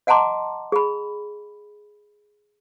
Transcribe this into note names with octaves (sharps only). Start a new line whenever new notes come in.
D#5 F#5 A5 A#5 C6 D6
G#4 B5